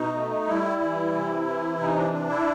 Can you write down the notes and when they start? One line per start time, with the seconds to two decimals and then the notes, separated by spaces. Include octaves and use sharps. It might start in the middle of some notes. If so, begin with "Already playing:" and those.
Already playing: B2 D#4
0.15 A3
0.48 G3 E4
0.81 E3
1.14 C3
1.47 E3
1.79 C3 D#4
1.96 D4
2.13 D4
2.29 E4